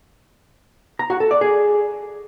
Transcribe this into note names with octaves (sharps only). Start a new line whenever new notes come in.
A#5
F#4
A4
D5
G#4